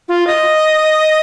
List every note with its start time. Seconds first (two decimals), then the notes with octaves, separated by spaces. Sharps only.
0.08 F4
0.27 D#5